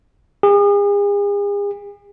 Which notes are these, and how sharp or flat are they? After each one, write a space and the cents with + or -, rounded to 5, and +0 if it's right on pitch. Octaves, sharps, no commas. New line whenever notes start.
G#4 -40